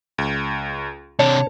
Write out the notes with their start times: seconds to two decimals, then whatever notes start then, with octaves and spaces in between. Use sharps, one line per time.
0.18 C#2
1.19 C3 D4 C#5 A5